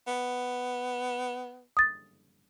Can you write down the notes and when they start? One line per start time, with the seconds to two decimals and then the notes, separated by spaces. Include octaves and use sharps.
0.08 B3
1.77 D#6 A6